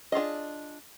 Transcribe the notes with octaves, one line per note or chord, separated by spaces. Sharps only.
D4 F4 G#4 D#5